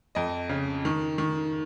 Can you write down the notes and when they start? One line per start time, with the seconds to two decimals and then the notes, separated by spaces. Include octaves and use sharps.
0.15 F2 D#5
0.49 C#3
0.85 D#3
1.18 D#3